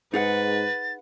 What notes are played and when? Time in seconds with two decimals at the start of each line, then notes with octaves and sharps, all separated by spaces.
0.14 G#2 D#4 G#4 B4 F#5 A6